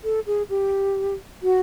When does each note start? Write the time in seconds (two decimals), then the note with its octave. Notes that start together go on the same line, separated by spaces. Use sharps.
0.04 A4
0.27 G#4
0.50 G4
1.43 F#4